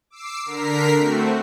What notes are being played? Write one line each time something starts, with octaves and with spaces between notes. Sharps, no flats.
D6 E6 C7
D3 A#4 A#5 B6 C7
A3 C4 F#4